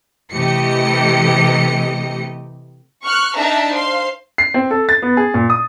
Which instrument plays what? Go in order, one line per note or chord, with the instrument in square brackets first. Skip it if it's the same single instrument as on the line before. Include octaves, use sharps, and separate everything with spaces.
[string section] C3 E3 A3 G4 D#5 C#7
[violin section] C#6 F6 F#6
D4 D#4 E5 A5 A#5
C5 F5 C6
[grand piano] C7
C4
A4
A6
B3
G#4
A#2
D#6